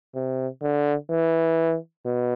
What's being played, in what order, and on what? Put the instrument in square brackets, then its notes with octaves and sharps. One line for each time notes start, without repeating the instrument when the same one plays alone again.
[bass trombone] C3
D3
E3
B2